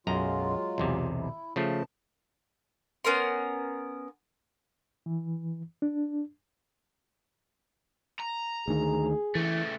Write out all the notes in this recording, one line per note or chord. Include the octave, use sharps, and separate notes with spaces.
B1 F#2 F#3 G#3 F4 A#5
B1 E2 C3
E4
C#3 F3 A3 A5
B3 C#4 A#4 C6
E3
D4
A#5
D2 D#3 G#4
C#3 E3 A3